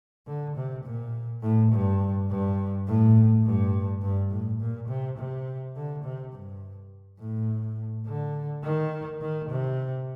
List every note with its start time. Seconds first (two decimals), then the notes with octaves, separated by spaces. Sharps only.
0.27 D3
0.56 C3
0.84 A#2
1.42 A2
1.72 G2
2.30 G2
2.87 A2
3.45 G2
4.02 G2
4.31 A2
4.59 A#2
4.89 C3
5.18 C3
5.76 D3
6.04 C3
6.32 G2
7.19 A2
8.06 D3
8.63 D#3
9.21 D#3
9.50 C3